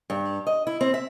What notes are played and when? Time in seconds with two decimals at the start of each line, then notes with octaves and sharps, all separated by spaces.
0.10 G2
0.47 D#5
0.67 E4
0.81 C4
0.94 E5